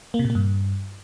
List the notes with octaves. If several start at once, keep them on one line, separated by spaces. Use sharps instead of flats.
A#3
C3
A#2
A#3
G2